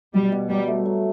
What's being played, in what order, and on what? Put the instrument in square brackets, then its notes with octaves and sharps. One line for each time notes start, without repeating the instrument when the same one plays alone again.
[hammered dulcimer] B2 [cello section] G3
[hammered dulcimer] B2
[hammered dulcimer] F#3 [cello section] G3
[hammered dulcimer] A3
F#3